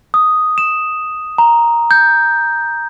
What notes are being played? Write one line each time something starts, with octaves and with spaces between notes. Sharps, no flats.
D#6
E7
A#5
G6